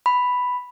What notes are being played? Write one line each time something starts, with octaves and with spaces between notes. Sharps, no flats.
B5